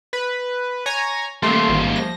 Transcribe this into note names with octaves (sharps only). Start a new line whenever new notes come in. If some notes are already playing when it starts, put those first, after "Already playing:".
B4
C#5 G#5 A#5
G3 A3 A#3 C6
G#1
F3 A#6